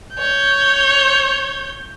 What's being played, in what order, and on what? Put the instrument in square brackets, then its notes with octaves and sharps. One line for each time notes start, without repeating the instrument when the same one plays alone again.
[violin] C#5 G6